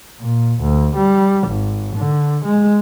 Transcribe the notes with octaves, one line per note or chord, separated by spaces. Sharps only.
A#2
D2
G3
G#1
D3
G#3